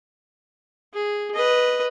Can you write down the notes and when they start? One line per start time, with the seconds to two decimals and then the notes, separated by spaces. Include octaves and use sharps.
0.94 G#4
1.34 B4 D#5